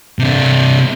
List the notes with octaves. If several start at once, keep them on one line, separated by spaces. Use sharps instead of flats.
C3 D4